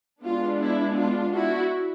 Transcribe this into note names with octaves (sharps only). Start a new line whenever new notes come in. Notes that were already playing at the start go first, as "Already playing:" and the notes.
G#3 B3 D4 F4
E4
F4
E4 F#4